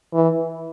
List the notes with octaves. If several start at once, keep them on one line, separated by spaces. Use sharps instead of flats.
E3